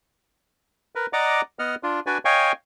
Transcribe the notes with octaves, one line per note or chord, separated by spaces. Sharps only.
A#4 B4
D5 D#5 F#5 A#5 D6
B3 D#5 F#5 F6
D4 F4
D4 F#4 B4 D5 G#5
C#5 D#5 F5 G5 G#5 C#6